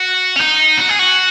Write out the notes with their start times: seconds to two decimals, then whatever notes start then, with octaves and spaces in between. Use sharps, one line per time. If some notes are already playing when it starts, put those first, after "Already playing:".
Already playing: F#4
0.36 C#4
0.41 D#4
0.78 F#4
0.89 G#4
0.99 F#4